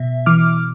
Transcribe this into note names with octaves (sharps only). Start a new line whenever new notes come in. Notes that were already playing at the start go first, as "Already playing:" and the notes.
Already playing: B2 E5
E3 D6 F6